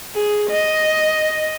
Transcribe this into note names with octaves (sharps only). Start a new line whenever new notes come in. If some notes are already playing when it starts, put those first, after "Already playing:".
G#4
D#5